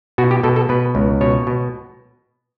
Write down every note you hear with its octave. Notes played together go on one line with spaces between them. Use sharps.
B2 F#4
G4
B2 A4
A4
B2 B4
C#2
B2 C#5
B2